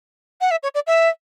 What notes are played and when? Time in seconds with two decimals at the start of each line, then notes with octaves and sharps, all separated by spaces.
0.41 F#5
0.51 E5
0.63 C#5
0.75 D5
0.87 E5